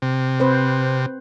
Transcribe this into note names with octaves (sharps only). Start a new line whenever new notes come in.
C3
C4 B4 C5